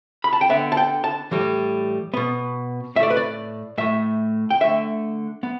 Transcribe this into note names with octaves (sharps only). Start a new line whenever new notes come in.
B5
A5
G5
D3 B3 E5
A5
G5
A5
A2 E3 G3
B2 B3
A2 A3 D5 E5
B4
D5
A2 A3 E5
G5
D3 A3 E5
B3